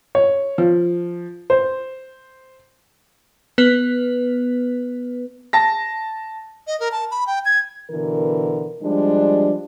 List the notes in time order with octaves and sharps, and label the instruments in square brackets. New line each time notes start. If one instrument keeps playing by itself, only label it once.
[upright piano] C#5
F3
C5
[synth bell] B3 B4
[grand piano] A5 A#6
[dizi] D#5
A#4
A5
B5
G5
G#6
[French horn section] B2 D3 E3 A#4
F3 G3 G#3 D4